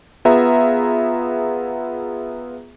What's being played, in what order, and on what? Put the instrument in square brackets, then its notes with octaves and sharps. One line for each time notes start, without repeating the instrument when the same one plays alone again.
[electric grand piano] B3 F4 G#4 B4 E5 A#5